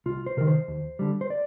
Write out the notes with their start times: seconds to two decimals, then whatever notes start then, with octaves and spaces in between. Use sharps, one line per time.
0.06 C2 F4
0.26 C5
0.37 C3 D#3 A#4
0.47 C5
0.68 D#2
0.99 D3 G3
1.21 C5
1.30 D5